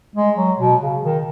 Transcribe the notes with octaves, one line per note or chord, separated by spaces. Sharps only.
G#3
F#3
B2
C#3
D#3